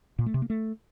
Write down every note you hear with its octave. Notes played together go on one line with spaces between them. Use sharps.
A#2
A3
C3
A#3
A3